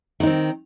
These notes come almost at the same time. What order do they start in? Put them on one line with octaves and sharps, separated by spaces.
D#3 D#4 C4